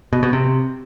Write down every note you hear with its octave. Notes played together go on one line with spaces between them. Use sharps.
B2
B2
C3